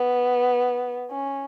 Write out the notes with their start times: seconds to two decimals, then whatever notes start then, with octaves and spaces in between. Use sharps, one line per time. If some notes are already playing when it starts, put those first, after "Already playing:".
Already playing: B3
1.11 C#4